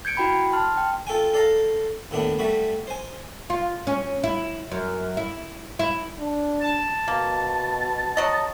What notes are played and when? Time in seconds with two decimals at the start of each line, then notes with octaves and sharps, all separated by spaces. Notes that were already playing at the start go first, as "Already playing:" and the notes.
0.05 G6 G#6 C#7 D7
0.17 E4 F#4 G5 B5
0.52 A5 C6 F6
0.77 G5
1.07 F4 A4 G5 G#5
1.34 A4 D5 F5 A#5
2.11 D#2 A2 B3 D4
2.39 G3 A3 F#4 B5
2.87 C5 G#5
3.50 F4
3.87 C#4
4.23 E4
4.71 F#2
5.17 E4
5.79 E4
6.19 D4
6.60 A5
7.08 B2 A#3
8.17 F#3 D#5